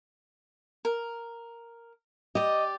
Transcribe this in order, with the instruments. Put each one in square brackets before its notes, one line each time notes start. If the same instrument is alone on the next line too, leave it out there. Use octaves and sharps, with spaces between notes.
[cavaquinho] A#4
[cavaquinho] G4 D5 [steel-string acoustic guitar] D#5